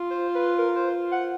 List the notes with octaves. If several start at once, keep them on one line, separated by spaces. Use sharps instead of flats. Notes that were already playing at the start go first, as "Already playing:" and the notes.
Already playing: F4
C5
B4
A#4
C5
F#5